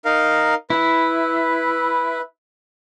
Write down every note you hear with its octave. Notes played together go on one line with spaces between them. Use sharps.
D#4 A#4 F5
E4 B4